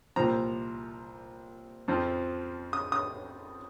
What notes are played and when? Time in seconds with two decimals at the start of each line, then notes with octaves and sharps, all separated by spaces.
0.16 C2 A#2 F3 C4 A#5
1.88 F2 F3 C4
2.73 D#6
2.92 D#6